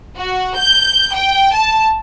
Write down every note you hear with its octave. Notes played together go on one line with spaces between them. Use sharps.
F#4
G6
G5
A5